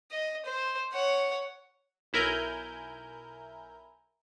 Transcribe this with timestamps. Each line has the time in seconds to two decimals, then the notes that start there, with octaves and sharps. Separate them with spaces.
0.11 D#5
0.46 C5
0.94 C#5 F#5
2.13 B1 E4 A#4 G#5 G6